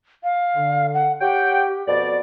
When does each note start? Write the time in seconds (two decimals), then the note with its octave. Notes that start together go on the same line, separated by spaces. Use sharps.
0.24 F5
0.55 D3
0.94 F#5
1.21 G4 C#5 F#5 G5
1.87 F2 B2 D5